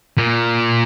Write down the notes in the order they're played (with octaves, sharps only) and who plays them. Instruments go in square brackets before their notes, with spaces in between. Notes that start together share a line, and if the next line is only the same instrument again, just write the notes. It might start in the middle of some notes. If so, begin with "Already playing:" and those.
[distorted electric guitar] A#2